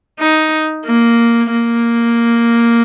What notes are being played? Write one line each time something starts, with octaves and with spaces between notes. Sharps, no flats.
D#4
A#3
A#3